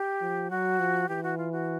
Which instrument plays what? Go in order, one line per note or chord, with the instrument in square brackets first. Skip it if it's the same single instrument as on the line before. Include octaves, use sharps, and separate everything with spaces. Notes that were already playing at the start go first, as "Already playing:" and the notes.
Already playing: [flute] G4
[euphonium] F3
[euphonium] F#3 [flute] F#4
[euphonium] F3
[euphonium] E3 [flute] G4
[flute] F#4
F4
F#4